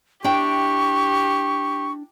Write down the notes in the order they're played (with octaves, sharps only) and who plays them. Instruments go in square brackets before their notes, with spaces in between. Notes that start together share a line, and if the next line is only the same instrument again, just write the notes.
[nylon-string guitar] D4 E4 G5 [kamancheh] G4 [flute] C#6